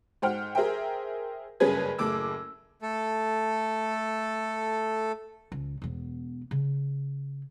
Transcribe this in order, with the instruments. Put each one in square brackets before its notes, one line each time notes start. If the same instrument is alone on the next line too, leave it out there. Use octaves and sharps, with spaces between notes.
[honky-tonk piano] G#2 C5 F#5 G5 F6
G#4 A#4 C5 E5 G5
F#1 G2 C#4 G#4 B4 G#6
F#1 A2 D6 E6
[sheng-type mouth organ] A3 A4
[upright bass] C#2
E1 B3
C#3